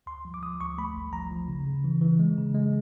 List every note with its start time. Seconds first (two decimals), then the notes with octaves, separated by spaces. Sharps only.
0.06 D2 C6
0.25 F3
0.34 D6
0.42 F3 D#6
0.60 D2 C#6
0.78 A3 B5
0.96 G#1
1.13 F3 A#5
1.31 F3
1.48 C#3
1.66 C#3
1.84 E3
2.01 E3
2.19 G#3
2.38 C#3
2.55 G#3